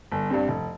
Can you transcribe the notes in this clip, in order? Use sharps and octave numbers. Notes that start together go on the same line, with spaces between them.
G1
G2 G3 C4
F1